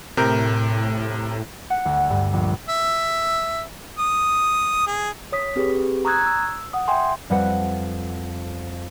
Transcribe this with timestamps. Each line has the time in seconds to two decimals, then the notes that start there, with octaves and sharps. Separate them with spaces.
0.17 A2 C3 A#4 G6
1.70 F#5
1.85 D2
2.10 G2
2.33 A#1
2.69 E5
3.99 D#6
4.87 G#4
5.32 C#5 D#6 B6
5.56 C4 G4 G#4 B4
6.05 A#5 C#6 D#6 E6 F#6 G#6
6.27 E6
6.73 F#5 D#6
6.88 E5 G5 G#5 C6
7.30 F2 G3 B4 F#5 B5